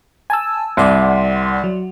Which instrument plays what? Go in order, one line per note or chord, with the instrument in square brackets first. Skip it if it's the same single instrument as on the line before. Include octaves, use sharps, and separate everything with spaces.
[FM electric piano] G#5 A5 E6
[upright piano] C2 [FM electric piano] D5 F#5 C6
[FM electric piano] F#3